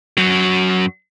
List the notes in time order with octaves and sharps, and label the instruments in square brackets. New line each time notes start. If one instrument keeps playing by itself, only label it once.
[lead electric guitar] F#2 F#3